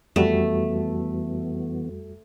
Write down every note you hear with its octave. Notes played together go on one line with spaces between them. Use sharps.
F2 E3 G3 A3 B3 F#4